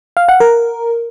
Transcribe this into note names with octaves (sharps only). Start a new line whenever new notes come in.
F5
F#5
A#4